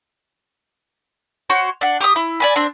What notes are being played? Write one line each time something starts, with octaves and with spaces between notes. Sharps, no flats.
F#4 C5 C#5
D4 F#5
G4 D6 D#6
E4
D5 G#5 B5
C4 D4